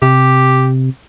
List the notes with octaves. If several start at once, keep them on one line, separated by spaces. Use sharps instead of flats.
C3 G4